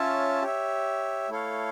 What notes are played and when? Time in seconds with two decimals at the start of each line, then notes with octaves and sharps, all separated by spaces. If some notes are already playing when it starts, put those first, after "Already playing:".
Already playing: C#4 F4 C#5 E5 A5
0.42 G4 C#5 E5
1.29 A3 E4 A4 C#5 F5